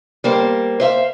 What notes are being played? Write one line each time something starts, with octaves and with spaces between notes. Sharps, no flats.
G3 A#3 C5
C5 E5 F5